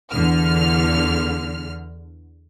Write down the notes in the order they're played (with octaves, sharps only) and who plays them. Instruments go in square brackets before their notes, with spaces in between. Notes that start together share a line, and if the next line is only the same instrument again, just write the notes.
[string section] E2 D3 F6